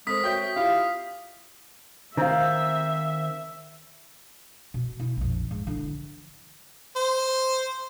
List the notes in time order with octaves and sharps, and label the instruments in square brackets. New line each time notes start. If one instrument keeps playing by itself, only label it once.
[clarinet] G#3 [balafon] C4 A4 C5 [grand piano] A#4 [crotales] D#6 B6
[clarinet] F#4 [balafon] C#5 E5 [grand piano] G5 G6
[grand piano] E4 F4 G4 [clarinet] F5
[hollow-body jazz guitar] D#3 C4 [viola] E5 [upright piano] F5 A#5
[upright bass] B2
E4
A#1 F2
G#2
D3 E3
[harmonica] C5